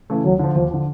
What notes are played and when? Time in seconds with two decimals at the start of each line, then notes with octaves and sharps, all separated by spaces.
0.10 C#3 E3 A3
0.24 D#2 F#3
0.39 D3 F3
0.55 D#2 F3
0.71 D3 F3